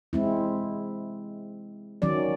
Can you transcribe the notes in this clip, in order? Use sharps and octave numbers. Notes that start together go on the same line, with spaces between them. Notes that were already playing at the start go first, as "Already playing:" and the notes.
G#3 C4 E4
D#3 F#3 C#4 D5